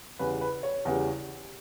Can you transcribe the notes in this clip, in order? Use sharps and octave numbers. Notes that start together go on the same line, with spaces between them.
E2 C#3 G3 B4
B4
C#5
E2 C#3 G3